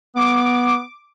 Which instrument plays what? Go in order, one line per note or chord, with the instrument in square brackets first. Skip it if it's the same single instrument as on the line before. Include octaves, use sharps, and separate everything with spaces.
[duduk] B3 [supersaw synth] D6